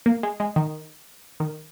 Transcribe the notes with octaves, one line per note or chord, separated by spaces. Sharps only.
A#3
G#3
G#3
D#3
D#3